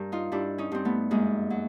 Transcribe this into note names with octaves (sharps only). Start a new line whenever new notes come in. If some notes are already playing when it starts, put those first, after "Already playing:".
Already playing: G2 A#4
D#4 F4
G2 D4 E4
C#4 D#4
G2 C4
A3 B3
F#2 G#3 A#3
F#3